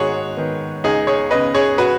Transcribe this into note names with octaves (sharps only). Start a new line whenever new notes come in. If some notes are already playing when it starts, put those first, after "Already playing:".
Already playing: G#2 D#3 F#4 G#4 C#5
D#3 B3
C#2 D#4 G#4
G#4 C#5
C#3 B3 B4 D#5
G#4 C#5
F#4 B4